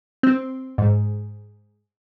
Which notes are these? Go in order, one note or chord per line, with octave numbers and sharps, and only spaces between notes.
C4
G#2